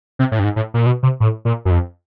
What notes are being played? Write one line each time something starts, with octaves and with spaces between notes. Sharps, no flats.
C3
A2
G2
G#2
A2
A#2
B2
C3
A2
A#2
F#2
F2